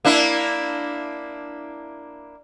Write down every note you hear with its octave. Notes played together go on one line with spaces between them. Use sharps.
A#3 D4 E4